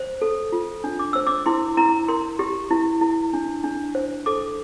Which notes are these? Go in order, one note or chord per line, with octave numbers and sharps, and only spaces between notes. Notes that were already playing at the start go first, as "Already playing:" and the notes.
Already playing: C5
A4
F4
D4
D6
C5 E6
D6
E4 C6
E4 A#5
A#4 C6
G4
E4
E4
D4
D4
C5
A4 D6